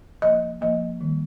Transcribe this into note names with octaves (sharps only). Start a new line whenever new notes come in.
F3 A#3 D#5
F3 A#3 D#5
D#3 G3 A#3